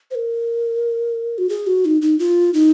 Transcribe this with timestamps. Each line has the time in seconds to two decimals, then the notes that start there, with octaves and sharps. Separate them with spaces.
0.11 C5
0.15 A#4
1.38 F#4
1.49 G#4
1.67 F#4
1.85 D#4
2.02 D#4
2.19 F4
2.54 D#4